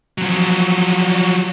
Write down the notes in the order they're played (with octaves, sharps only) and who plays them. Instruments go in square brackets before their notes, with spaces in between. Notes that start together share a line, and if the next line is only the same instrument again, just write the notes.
[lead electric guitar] F3 F#3